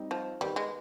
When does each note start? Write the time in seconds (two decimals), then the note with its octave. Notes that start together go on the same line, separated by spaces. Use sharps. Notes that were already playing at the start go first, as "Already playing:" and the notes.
Already playing: G3 C4 D#4
0.11 F3
0.41 D#3 G3 B3 D#4 G4 B4
0.56 G#3